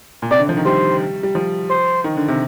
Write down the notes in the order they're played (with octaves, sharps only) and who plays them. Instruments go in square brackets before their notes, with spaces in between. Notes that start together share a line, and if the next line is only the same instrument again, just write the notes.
[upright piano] A#2
[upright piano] C3 [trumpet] D5
[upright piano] D3
F3
D#3
[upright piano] G3 [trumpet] C5
[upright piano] G3
F3
[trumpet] C5
[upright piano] D#3
D3
C3